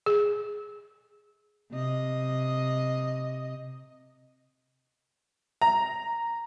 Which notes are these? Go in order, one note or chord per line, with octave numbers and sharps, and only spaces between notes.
G#4
C3 D#5
A#5